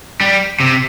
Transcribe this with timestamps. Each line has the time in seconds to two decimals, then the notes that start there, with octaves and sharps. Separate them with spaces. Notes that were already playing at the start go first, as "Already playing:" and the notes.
0.21 G3
0.60 C3